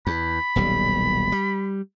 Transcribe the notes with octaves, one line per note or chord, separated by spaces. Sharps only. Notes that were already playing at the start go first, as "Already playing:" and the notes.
E2 B5
D#1 B1 G3
G3